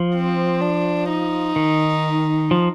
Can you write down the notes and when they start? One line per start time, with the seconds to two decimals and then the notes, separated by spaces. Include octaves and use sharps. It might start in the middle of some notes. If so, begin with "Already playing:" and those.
Already playing: F3
0.15 C4
0.61 D4
1.10 D#4
1.56 D#3
2.51 F3